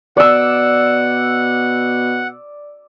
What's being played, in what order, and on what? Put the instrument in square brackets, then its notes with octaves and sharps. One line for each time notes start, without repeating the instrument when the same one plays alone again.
[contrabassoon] B2 [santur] D5 E6 [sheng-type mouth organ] F#5